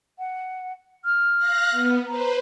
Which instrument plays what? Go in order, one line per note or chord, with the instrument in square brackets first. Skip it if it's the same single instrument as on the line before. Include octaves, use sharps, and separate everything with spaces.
[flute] F#5
F6
[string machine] F5 F#6 A#6
B3
[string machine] B4 C5 [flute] A#5